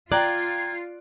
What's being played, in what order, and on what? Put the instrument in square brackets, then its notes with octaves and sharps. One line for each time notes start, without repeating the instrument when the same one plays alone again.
[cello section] F4 [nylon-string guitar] D5 [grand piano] G5 A#5 F#6 [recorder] G#6